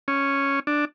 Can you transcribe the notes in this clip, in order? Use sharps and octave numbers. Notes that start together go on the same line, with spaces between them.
C#4
D4